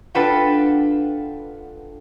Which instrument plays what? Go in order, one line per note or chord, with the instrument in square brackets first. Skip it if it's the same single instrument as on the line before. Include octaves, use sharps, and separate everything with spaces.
[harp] D4 F4 A4 B4 F#5 G5